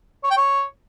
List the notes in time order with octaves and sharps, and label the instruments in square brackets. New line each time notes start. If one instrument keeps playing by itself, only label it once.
[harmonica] C#5
G5
C#5